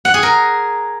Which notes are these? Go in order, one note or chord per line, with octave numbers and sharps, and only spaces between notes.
F#5
G#4
A#4